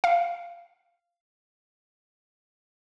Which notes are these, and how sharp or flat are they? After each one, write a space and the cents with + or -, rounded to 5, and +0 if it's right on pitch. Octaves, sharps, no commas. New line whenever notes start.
F5 -10